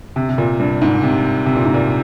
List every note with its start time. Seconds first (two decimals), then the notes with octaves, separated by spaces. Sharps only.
0.16 C3
0.29 C3
0.38 A#2
0.60 G2
0.82 G#2
1.03 C3
1.46 C3
1.55 A#2
1.65 G#2
1.74 A#2